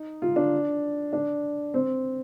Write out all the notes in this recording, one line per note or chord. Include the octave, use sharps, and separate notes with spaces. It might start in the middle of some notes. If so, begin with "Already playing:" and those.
Already playing: D#4
F4
D4
D4
C4